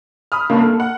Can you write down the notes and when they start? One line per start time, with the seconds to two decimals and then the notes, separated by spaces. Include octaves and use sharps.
0.32 B5 D#6 F6
0.50 C2 G2 C#3 A#3
0.63 A4
0.80 F#5